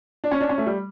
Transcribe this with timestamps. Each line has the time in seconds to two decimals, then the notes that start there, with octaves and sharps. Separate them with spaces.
0.24 D4
0.31 C#4
0.40 D4
0.49 C#4
0.58 A3
0.66 G3